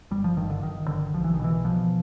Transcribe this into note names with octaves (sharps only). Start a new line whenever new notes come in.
G1 G3
F3
G2 D#3
D3
G1 D#3
D3
B1 F3
E3
D#3
B2 E3
B2 F3